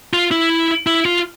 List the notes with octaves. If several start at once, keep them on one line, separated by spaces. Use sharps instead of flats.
F4
E4
E4
F4